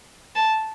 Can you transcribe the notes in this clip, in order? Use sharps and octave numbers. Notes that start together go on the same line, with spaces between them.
A5